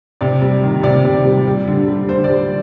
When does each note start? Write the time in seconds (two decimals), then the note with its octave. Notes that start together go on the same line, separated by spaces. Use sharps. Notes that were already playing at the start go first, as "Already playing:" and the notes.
0.21 C3 D5
0.42 G3
0.64 D#3
0.83 C3 D5
1.05 C3
1.25 G3
1.47 G3
1.68 D3
1.88 G3
2.09 D3 C5
2.24 D5
2.30 G3